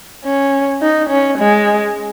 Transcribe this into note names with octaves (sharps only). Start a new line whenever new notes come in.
C#4
D#4
C#4
G#3